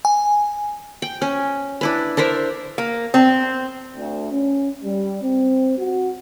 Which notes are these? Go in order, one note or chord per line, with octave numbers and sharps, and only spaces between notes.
G#5
G5
C#4
D4 E4 B4
D4 A#4 C5 E5
A#3
C4
D2
C#4
G3
C4
F#4